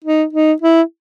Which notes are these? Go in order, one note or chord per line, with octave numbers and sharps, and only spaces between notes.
D#4
D#4
E4